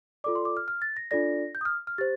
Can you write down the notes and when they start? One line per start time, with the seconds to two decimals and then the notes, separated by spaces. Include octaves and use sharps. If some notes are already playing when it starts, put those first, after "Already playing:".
0.24 F4 A4 D5 D6
0.35 C6
0.45 D6
0.57 F6
0.68 F6
0.82 A6
0.97 A#6
1.11 D4 F4 A4 D5 A#6
1.55 G6
1.61 D#6
1.65 F6
1.87 F6
1.98 G4 C5 A6